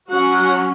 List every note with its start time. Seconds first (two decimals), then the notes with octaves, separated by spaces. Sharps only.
0.10 F#3 C#4 F#4 F#5